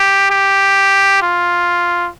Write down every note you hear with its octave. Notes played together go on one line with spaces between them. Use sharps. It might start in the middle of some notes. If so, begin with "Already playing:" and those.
Already playing: G4
G4
F4